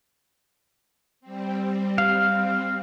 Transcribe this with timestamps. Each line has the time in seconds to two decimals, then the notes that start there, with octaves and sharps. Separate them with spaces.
1.21 G3 C4
1.98 F5